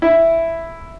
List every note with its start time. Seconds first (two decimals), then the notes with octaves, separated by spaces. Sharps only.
0.02 E4